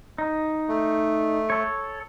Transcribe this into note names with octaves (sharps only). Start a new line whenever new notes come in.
D#4
A3
A4 C#5